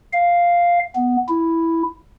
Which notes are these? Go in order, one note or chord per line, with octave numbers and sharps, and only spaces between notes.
F5
B3
E4